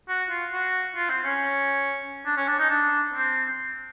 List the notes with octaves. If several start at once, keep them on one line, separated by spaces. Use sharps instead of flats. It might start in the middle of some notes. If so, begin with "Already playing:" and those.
F#4
F4
F#4
F4
C4
C#4
D4
C#4
D4
D#4
D4
C4